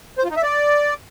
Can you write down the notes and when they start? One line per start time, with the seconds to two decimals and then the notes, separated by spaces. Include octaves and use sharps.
0.18 C5
0.24 F4
0.31 D#4
0.37 E5
0.43 D5